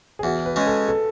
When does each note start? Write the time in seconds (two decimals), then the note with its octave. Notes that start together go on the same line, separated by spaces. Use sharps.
0.19 G#4
0.23 E2 F#4
0.46 B4
0.56 C#3 G#3
0.67 A4
0.89 A4